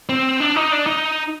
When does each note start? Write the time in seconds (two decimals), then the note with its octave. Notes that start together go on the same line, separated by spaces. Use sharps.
0.09 C4
0.40 D4
0.56 D#4
0.72 D4
0.86 D#4